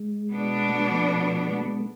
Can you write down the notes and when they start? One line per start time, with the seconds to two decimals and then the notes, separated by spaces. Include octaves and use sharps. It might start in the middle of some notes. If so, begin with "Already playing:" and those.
Already playing: G#3
0.31 B2 B3 D4
0.69 A3
0.80 G#3
0.91 F3 A3
1.47 G#3
1.60 A3
1.66 G#3 B3
1.80 A3